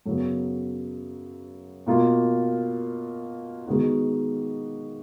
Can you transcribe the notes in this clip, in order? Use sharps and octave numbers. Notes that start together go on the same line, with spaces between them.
F#2 C#3 F#3 B3
B2 A#3 F4
D#3 G#3 B3 F#4